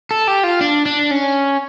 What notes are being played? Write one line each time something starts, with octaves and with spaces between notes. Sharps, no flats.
A4
G4
F4
D4
D4
C#4